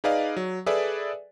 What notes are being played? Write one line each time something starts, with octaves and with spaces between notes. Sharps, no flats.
D#4 G#4 B4 D5 D#5 F5
F#3
G#4 A4 B4 D5 E5